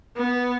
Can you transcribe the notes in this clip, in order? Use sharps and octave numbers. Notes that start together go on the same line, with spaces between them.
B3